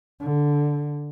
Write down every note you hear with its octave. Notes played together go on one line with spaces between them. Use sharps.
D3